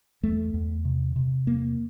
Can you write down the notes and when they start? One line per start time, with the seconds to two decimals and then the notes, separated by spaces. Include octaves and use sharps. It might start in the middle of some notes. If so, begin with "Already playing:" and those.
0.23 E2 A3
0.54 E2
0.85 C3
1.16 C3
1.46 E2 A#3